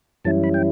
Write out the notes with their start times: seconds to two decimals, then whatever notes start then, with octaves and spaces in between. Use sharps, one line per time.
0.24 F#2 E3 G3 C#4 E4 A5
0.44 B5
0.54 G5